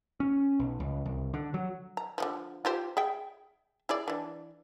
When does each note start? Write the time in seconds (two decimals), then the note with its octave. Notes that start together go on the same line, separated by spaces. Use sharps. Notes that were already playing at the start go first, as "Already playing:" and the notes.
0.20 C#4
0.60 B1
0.80 C#2
1.05 C2
1.34 D3
1.54 F#3
1.97 A#5
2.18 D3 D#3 F3
2.65 F4 G4 C5
2.97 G#4 E5 G5
3.89 E4 G#4 D5
4.08 E3 D4